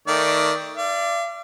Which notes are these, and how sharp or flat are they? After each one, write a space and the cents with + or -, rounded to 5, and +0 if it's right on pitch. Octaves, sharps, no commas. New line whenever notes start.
D#3 +15 A3 +15 D5 +0
D5 +0 F5 -45